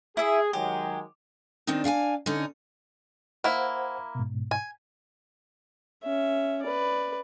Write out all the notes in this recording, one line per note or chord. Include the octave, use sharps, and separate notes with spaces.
E4 G#4 E5
D#3 F#3 G#3 G4
D#3 C4 D4 D#4
D4 F5 G5 G#5
D3 C#4 D#4
A#3 E4 C5 F#5
G#2 B2
G#5
C#4 E5
B4 D5